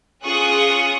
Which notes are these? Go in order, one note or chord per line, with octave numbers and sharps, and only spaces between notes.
C#4 F4 G#4 C#6 D#6 F#6